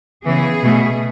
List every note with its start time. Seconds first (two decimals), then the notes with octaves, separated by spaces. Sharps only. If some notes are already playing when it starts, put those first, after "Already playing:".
0.25 C#3 E3 B3 G#4
0.63 B2 A3